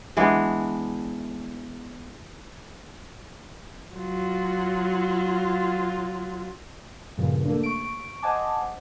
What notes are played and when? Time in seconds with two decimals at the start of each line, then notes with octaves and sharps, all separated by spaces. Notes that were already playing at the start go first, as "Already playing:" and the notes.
0.17 E3 G#3 B3 D4
3.95 F#3 F4
7.18 G2 A#2 C#3 F3
7.45 A3 A#3 D4
7.63 C#6 D7
8.22 C5 D#5 F#5 G#5 A5 D6